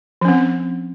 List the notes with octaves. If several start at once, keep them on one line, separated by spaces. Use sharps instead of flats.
F3 C4 C#4